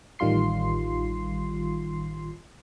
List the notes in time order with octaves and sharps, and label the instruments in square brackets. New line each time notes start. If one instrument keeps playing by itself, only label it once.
[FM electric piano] A1 D#3 G3 F4 C6 C7